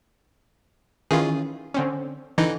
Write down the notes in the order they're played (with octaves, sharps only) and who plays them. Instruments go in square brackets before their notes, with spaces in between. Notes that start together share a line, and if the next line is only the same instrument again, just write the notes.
[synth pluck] D#3 E3 C#4 [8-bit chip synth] F4 G#4
[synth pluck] D3 C4 C#4
[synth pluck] D3 [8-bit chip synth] E3 D#4